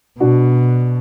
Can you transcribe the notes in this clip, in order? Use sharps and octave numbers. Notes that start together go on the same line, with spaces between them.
B2 D4 F#4